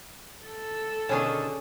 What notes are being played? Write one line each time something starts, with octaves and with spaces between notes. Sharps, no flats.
A4
B2 D3 D#3 C#4 G#4